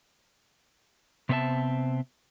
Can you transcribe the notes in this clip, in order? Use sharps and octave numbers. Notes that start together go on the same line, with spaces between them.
C3 B3 C4 B4 E5 A5